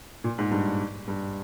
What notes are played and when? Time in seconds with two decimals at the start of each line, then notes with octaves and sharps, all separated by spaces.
0.24 A#2
0.38 G#2
0.51 G2
1.08 G2